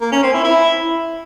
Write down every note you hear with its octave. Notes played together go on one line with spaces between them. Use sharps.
A#3
C#4
C4
E4
E4